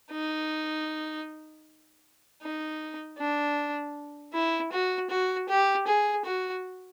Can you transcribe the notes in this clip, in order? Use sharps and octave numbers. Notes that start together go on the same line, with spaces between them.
D#4
D#4
D4
E4
F#4
F#4
G4
G#4
F#4